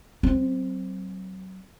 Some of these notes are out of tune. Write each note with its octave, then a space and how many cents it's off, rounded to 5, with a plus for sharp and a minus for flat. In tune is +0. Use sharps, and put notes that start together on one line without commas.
F#3 +25 C4 +0